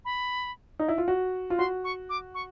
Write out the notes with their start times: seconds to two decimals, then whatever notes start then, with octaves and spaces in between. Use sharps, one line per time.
0.05 B5
0.79 D#4
0.88 E4
0.98 F4
1.08 F#4
1.50 F4
1.58 F#4 C6
1.84 C#6
2.09 D6
2.35 C#6